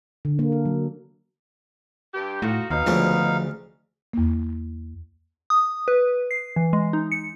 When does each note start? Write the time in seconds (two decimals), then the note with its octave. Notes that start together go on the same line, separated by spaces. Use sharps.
0.25 D3
0.39 A#3
0.52 A4
0.65 F#3
2.14 G2 G4
2.42 A2 D#4 F4 F#4
2.70 D#2 B2 D#4 F5
2.86 D2 C#3 F3 G#3
4.13 E2 A#3
5.50 D#6
5.88 B4
6.31 C7
6.56 E3
6.73 G#3
6.93 D#4
7.12 C#7